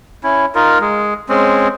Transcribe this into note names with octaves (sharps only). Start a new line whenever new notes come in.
C#4 E4
D#4 F4 A#4
G#3
G#3 C4 C#4